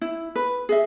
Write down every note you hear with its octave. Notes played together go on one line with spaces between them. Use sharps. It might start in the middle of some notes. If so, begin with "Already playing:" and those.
E4
B4
G#4 D#5 E5